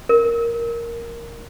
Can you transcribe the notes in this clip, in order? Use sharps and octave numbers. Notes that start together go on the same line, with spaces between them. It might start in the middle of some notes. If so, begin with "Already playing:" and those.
A#4